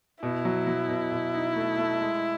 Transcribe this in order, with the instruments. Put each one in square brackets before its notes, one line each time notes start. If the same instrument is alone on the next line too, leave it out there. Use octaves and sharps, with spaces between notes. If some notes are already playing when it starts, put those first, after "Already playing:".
[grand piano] B2 [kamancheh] E4
[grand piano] F#3
F#3
B2
B2
D#4
A3
A3
G#3